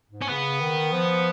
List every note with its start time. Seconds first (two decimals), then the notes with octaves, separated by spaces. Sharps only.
0.09 G#2
0.22 C#4
0.29 C#3 B3
0.61 D#3
0.92 F3